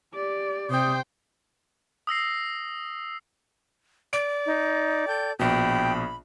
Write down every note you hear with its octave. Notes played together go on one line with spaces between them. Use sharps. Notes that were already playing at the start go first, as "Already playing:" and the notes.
G4 D5
C3 C5 G5 D#6
D#6 E6 A#6 C7
D5 D7
D#4
A4 G5 G6
A#1 B2 G5 B5